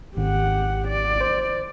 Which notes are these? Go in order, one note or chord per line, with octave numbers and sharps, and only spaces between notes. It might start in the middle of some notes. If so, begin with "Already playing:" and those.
G#1 G4 F#5
D5
C5